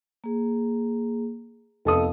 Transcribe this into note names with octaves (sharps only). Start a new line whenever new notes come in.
A#3 G#4
F1 B3 A4 D#5 F5 D#6